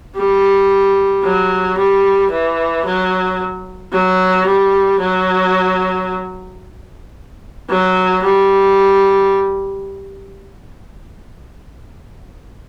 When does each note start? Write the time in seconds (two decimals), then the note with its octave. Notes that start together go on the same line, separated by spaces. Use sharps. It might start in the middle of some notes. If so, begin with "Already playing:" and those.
0.16 G3
1.24 F#3
1.78 G3
2.31 E3
2.85 F#3
3.92 F#3
4.47 G3
5.00 F#3
7.70 F#3
8.23 G3